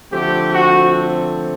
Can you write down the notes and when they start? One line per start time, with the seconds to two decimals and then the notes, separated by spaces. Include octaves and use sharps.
0.12 D3 F3 A3 C4 G4
0.54 F#4